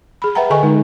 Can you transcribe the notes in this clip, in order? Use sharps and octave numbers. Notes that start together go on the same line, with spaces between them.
G#4 B5
B4 E5 F#5 G5 A#5
D3 G#4 A4 D#5 G#5 C#6
D3 G#3 D#4